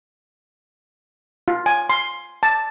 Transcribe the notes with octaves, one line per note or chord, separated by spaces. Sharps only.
F4
G#5
C6
A5